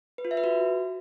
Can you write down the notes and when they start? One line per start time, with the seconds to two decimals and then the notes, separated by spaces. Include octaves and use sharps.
0.18 B4
0.25 F4
0.31 E5
0.37 B4
0.44 F#4